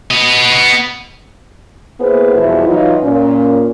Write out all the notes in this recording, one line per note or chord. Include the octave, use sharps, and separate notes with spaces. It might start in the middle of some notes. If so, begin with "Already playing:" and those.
B3 D#5
A#3 B3 E4 G#4 B4 C5
E2 B2 F3 G3 E4
E3 F#3 D#4 F4
A#2 C#4